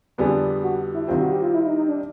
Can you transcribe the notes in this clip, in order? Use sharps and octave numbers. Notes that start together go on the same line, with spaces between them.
F2 D3 G3 B3 D4 G#4
F#4
E4
C3 D#3 G3 C4 F4
F#4
G4
F4
E4
D#4
D#4
D4